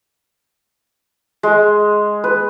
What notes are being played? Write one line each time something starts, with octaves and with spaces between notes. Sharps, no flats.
G#3
B4